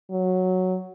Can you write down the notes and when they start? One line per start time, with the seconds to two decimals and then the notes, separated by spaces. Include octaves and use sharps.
0.11 F#3